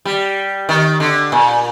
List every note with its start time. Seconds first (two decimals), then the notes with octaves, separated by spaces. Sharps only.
0.05 G3
0.69 D#3
1.00 D3
1.32 A#2